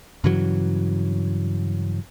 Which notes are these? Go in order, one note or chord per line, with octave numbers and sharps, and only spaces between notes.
G2 C#3 E3 F#3